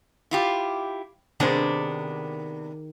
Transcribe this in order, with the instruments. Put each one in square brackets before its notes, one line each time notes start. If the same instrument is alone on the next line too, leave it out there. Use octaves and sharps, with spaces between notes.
[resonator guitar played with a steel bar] E4 F4 G4
[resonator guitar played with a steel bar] C3 B3 D4 [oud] D#3 G#4 C5